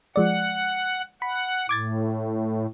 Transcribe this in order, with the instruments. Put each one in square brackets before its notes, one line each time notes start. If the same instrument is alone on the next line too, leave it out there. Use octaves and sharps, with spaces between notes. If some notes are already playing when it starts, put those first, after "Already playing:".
[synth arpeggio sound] F3 G#3 D5 [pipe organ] F#5
[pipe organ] F#5 [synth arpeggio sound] B5
[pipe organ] A2 [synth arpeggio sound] D6 G#6 A6